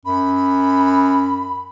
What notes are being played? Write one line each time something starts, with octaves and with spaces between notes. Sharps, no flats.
F#2 B5